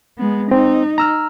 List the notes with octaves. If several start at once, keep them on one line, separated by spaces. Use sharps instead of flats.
G#3 B3
C4 D#4
A#5 E6 F6